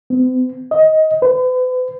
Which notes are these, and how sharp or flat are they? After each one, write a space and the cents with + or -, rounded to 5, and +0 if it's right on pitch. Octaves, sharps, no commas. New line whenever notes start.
C4 -45
D#5 +15
B4 +40